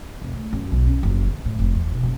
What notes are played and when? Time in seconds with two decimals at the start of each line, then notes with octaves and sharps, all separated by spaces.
0.22 F1
0.33 A3
0.53 F#2
0.72 B1
0.87 C#4
1.03 F#1
1.26 D3
1.45 A2
1.59 F1
1.75 E2
1.91 B1
2.03 F#1